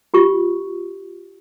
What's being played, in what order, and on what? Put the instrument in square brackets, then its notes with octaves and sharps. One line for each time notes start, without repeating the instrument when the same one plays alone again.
[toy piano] F4 G4 C#6